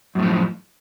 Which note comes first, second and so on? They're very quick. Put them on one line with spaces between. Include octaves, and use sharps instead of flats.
F#2 A2 F3